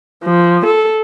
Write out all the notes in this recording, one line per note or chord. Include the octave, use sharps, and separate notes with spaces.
F3
A4